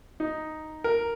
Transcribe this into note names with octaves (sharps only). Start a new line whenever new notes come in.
D#4
A#4